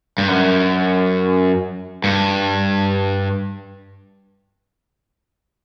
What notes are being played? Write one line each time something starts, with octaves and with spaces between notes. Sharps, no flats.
G2
F#2
G2